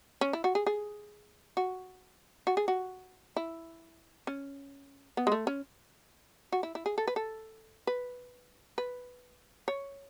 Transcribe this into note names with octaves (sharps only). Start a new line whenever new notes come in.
C#4
E4
F#4
G#4
G#4
F#4
F#4
G#4
F#4
E4
C#4
B3
G#3
A3
C#4
F#4
E4
E4
G#4
A4
B4
A4
B4
B4
C#5